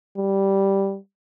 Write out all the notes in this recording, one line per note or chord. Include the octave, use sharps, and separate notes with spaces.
G3